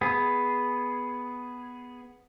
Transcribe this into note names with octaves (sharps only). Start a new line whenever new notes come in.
B3 G#4